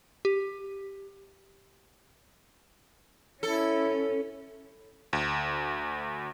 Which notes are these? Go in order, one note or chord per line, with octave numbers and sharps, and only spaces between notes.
G4
C#4 E4 A4
D2